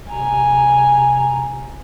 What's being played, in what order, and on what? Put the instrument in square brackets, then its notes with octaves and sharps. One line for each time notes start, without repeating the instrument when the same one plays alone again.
[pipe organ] C3 A#5 [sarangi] G#5